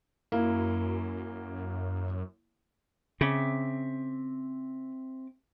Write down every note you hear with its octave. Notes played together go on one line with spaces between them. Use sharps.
F#2 A#3 E4
C#3 C4 E5 D6